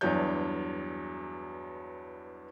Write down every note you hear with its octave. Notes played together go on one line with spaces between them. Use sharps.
E2 G2 F#3 D4 C#5 G6